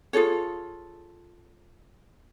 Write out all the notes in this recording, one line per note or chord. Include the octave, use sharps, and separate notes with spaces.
F4 G#4 A4 C#5